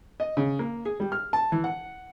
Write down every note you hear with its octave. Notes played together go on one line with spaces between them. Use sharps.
D#5
C#3
A#3
G#4
G3
F6
A5
E3
F#5